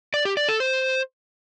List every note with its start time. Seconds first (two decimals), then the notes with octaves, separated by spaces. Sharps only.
0.14 D5
0.25 G4
0.37 D5
0.49 A4
0.60 C5